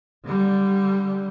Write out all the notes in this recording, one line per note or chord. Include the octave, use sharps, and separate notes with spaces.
D3 G3